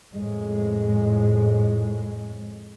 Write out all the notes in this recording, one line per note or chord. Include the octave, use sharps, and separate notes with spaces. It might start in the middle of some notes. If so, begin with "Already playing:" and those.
F2 A2 G#3